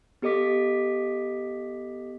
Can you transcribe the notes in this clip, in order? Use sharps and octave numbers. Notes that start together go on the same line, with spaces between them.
B3 G4 A4 D#5 D6 B6